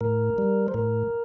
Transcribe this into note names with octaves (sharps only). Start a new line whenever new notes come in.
A2 A#4
G3
C5
A2 A#4